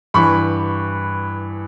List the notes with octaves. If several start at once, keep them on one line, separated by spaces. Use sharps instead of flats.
G2 E3 G3 B5 C#6